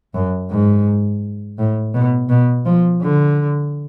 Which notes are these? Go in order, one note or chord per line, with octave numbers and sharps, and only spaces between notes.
F#2
G#2
A2
B2
B2
F3
D3